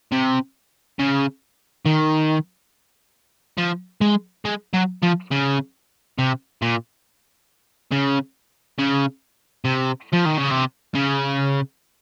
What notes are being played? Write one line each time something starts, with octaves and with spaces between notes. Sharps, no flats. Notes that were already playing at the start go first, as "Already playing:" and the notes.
C3
C#3
D#3
F3
G#3
G#3
F#3
F3
C#3
C3
A#2
C#3
C#3
C3
F3
D#3
C#3
C3
C#3